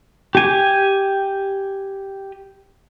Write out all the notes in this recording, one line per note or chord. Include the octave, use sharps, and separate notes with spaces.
G4 G#5